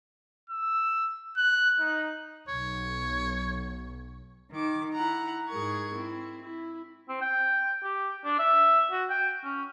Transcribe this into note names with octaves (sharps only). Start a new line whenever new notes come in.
E6
F#6
D#4
B1 C#5
D#3 D6
E4 F#5 A#5
G#2 G#4 A#4 C#6 G#6
C4 E4
E4
C4
G5
G4
D4
E5
F#4
G5
C#4